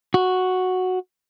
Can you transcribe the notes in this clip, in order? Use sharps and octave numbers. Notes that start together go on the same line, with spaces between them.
F#4